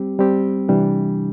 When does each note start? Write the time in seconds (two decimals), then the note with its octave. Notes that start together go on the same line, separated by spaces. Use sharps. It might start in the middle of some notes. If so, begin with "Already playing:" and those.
Already playing: G3 C4 G4
0.19 G3 C4 G4
0.69 C3 E3 G3 D4